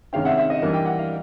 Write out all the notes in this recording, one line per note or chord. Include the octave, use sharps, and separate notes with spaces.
C3 D#3 G#3 C#4 F5 G5
E5 F#5
E5
D#5
E3 G3 A#3 D4
G5
F#5
F5